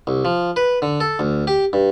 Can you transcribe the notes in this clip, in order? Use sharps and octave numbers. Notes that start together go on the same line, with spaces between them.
C2
F3
B4
D3
A4
D2
G4
G2